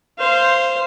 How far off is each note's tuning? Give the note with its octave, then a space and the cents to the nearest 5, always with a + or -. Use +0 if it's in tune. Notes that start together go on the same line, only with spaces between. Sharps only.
C5 +0 F5 -20